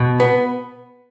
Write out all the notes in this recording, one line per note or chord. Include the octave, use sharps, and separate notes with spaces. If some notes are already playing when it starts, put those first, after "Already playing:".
Already playing: B2
B3